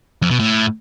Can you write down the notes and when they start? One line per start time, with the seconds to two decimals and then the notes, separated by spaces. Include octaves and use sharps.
0.22 F2
0.31 B2
0.39 A2